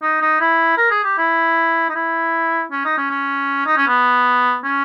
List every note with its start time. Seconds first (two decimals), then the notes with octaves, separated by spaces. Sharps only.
0.02 D#4
0.21 D#4
0.40 E4
0.77 A#4
0.91 G#4
1.04 G4
1.18 E4
1.89 D#4
1.95 E4
2.72 C#4
2.85 D#4
2.98 C#4
3.10 C#4
3.66 D#4
3.77 C#4
3.87 B3
4.64 C#4